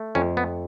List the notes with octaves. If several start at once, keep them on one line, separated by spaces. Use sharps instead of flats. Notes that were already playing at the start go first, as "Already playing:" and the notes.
Already playing: A3
F2 C#4
B3